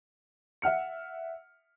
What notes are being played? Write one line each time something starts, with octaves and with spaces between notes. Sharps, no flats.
E5 F#5 F6 C#7